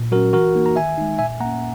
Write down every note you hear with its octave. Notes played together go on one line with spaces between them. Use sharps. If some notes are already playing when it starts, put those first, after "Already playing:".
Already playing: A#2
F#3 C#4 F#4 A#4
E3 F#4 A#4
A#3 D#4
A#5
D#3 E5 G#5
G#3 D#4
A#2 E5 G#5
A#3 C#4 F#5 A#5